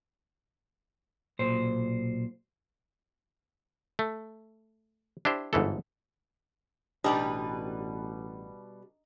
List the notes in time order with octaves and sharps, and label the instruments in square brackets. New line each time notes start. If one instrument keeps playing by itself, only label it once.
[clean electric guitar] B1 A#2 C5
[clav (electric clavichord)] A3
D4 E4 G4 C5
G1 G#2 E3 A4
[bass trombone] A1 [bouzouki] B2 G3 B4 [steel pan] D4 G4 [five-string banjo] D#4